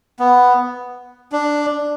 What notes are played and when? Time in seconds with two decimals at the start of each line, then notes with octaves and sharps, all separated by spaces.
0.20 B3
1.32 D4